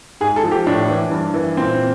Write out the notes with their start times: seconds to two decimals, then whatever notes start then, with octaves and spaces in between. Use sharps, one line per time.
0.20 G#2 G#4
0.36 A4
0.44 F3
0.51 G4
0.67 A2 D4
0.89 E3
1.11 G2
1.34 E3
1.57 A#2 C4